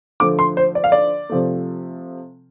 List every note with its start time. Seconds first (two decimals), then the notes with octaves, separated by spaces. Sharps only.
0.20 D3 F3 A3 D6
0.39 C6
0.57 C5
0.75 D5
0.84 F5
0.92 D5
1.30 C3 F3 A3